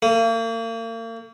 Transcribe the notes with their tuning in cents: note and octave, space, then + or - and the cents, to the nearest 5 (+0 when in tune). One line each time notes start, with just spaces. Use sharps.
A#3 -40